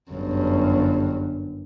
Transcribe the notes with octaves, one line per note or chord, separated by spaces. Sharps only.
G1 F#2